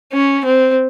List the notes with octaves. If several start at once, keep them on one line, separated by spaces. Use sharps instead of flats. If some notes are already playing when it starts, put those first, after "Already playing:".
C#4
C4